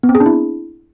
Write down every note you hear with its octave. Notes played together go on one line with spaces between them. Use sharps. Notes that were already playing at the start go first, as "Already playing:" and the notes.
B3
C4
G#4
D4
E4